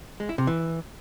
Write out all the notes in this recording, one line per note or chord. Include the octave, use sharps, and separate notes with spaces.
G#3
E4
C3
E3